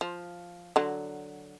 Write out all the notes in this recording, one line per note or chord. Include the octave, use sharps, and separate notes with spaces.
F3
D3 F#3